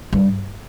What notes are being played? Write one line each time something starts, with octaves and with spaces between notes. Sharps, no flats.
G2